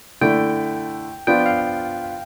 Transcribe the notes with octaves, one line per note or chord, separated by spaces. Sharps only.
D3 A3 E4 G5
F3 B3 D4 F4 G5
F5